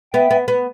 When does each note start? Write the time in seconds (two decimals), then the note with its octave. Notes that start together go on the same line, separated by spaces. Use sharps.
0.13 B3 E5 G5
0.31 B3
0.48 B3